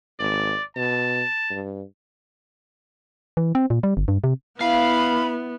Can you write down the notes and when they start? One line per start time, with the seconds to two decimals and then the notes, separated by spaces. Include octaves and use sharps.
0.19 G#1 D5
0.76 B2 A5
1.51 G2
3.37 E3
3.55 C4
3.70 A#2
3.83 G3
3.97 G1
4.08 G2
4.24 C3
4.61 B3 E4 F5 B5